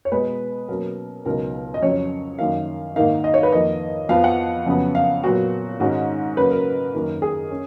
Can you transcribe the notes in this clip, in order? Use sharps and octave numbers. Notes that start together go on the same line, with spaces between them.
C#5
B2 G#3 B3 B4
B2 F#3 A#3 C#4 A#4
C#2 B2 F#3 B3 D#4 A#4
D#5
F2 C#3 F#3 C#4 C#5
F#2 D#3 A#3 F5
G#2 D#3 A#3 D#4 F5
D#5
C#5
B4
F2 D#3 A#3 D#5
F2 F3 B3 F5
F#5
F2 C#3 F#3 B3
F5
A#2 F#3 B3 F#4
G#2 D#3 G#3 C#4 F#4
C#3 F#3 A#3 C#4 B4
A#4
F#2 D#3 A#3
G#4
C#4